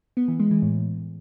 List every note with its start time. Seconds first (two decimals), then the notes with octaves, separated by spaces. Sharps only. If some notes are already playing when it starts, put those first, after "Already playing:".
0.17 B3
0.28 E3
0.40 G#3
0.51 E3
0.62 A2